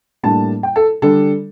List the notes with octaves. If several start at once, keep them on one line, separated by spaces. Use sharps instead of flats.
A2 G3 A#3 D4 A5
G5
A4
D3 G3 D4 A4